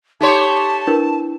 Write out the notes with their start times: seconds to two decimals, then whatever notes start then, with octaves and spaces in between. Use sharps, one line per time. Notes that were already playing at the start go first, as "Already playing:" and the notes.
0.21 A3 D#4 G4 C#5 A5 C6
0.87 D4 E4 A#4 B4